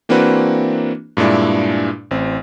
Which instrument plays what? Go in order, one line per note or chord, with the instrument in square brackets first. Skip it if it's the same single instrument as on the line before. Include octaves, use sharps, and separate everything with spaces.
[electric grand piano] E3 A#3 C4 D4 F#4 B4
G2 A#2 G#3 D4 E4
A1 C4